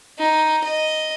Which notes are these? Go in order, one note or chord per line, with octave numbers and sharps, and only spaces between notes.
D#4
D#5